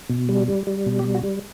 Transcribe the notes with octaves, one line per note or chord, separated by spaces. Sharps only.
B2
G3
G3
G3
B2
G4
G3
F#4
G3